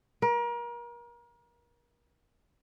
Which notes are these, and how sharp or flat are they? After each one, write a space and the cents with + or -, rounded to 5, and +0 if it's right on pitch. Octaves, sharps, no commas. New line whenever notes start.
A#4 +35